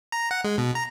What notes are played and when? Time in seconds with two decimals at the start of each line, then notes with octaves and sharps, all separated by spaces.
0.12 A#5
0.31 F#5
0.44 G#3
0.58 B2
0.75 A#5